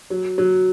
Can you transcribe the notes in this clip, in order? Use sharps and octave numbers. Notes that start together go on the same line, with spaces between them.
F#3
F#3